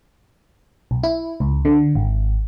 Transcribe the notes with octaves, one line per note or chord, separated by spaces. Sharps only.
B1
E4
C#2
D3
G#1